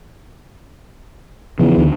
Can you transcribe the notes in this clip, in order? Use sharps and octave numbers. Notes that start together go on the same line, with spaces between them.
E2 C#3 F3
D2 D3 D#3